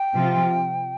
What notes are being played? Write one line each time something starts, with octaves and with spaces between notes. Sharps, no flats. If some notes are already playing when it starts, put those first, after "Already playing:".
Already playing: G5
C3 F3 C4 F4